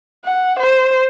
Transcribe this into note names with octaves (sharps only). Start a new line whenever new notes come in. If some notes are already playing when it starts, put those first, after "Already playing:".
F#5
C5